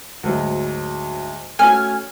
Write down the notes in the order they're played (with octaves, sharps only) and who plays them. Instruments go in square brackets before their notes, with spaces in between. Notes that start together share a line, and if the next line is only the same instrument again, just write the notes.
[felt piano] D2 G#2 F#3
[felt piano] A3 C#4 F#4 [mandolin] G#5 F6